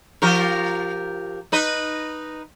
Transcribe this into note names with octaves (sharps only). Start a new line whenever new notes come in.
F3 G4 A#4
D#4 B4 D#5